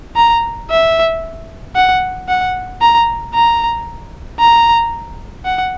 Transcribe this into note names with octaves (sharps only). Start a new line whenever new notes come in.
A#5
E5
F#5
F#5
A#5
A#5
A#5
F#5